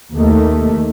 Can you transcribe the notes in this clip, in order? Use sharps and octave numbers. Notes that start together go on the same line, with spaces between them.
D#2 D#3 A3